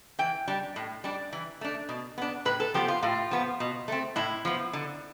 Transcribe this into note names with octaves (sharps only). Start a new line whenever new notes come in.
E3 G5
G3 D4
A2
G3 D4
E3
A3 D4
B2
B3 D4
A2 B4
A4
F3 B3 G4
F4
A2 F4
F3 B3
B2
A3 C4
A2 E4
F3 B3
D3